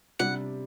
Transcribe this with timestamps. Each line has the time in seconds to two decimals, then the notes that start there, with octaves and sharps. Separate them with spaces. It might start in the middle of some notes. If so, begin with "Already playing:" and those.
0.19 C3 G3 D4 F#5